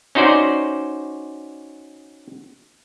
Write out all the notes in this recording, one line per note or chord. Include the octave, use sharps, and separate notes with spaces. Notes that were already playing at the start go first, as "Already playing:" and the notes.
C#4 D#4 F#4 C5 D5